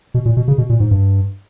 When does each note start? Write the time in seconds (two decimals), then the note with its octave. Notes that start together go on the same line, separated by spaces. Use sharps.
0.14 B2
0.25 A#2
0.37 B2
0.48 C#3
0.58 B2
0.69 A#2
0.80 G#2
0.91 G2